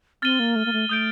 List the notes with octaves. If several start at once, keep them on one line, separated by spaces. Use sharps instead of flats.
C4 F6 A6 D#7 G7
A#3
A3
A#3
A3
A3 D#6 G6 D7